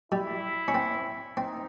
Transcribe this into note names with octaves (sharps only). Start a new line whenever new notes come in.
G3 E4
C#4
C4
C4 D#4